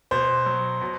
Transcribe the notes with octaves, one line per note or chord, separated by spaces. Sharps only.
B2 C5
F#3
B2